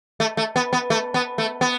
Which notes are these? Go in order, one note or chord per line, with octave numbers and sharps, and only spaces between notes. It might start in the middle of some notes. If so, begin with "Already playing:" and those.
A3
A3
B3
B3
A3
B3
A3
B3